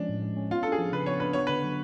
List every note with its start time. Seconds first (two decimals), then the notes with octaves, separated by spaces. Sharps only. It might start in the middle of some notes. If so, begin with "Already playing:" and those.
Already playing: F3 G#3 C#4 D4
0.09 A2
0.22 G#3
0.37 C#4
0.51 B3 F4
0.63 D4 A4
0.72 G#4
0.78 F3
0.92 C#3 B4
1.06 B3 C#5
1.20 D4 B4
1.33 B3 C#5
1.47 D3 B4
1.64 F#3